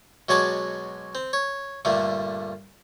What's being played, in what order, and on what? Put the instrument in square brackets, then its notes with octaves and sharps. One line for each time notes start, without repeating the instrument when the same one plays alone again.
[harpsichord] B2 F#3 G#3 C#5 D5 A5
C4
C#5
G2 A#2 D3 A3